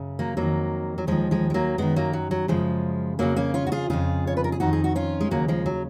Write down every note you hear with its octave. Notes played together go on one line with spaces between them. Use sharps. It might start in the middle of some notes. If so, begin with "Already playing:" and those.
Already playing: F#2 C#3
F#3 A#3
F2 D#3 F#3 A#3
F#3
D#2 D#3 F3 G#3
F3 G#3
G#3
F#3 A#3
F#2 D#3 G#3 B3
F#3 A#3
F#3
F#3
F#2 C#3 F3 G#3
F2 C#3 F#3 A#3
A#3 C#4
C#4 F4
F#4
F4 G#4
F2 C#3 F4 G#4
C#5
B4
A#4
G#4
F2 D#3 D#4 F#4
G#4
F#4
C#4 F4
G#3
D#2 C#3 F#3 A#3
F3 G#3
F#3